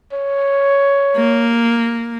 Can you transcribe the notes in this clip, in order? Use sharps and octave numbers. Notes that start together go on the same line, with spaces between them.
C#5
A#3